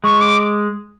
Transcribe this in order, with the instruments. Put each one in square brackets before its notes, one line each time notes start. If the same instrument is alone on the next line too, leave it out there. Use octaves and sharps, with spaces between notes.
[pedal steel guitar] G#3 [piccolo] C#6
[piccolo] D6